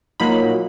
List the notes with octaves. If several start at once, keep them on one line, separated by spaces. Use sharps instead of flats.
A#2 F#3 A#3 D#4 B5